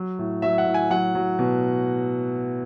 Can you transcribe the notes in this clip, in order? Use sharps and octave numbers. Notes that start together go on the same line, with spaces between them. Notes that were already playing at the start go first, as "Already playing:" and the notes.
Already playing: F#3
A2
F#3 E5
F#5
A2
G#5
F#3 F#5
F#3
B2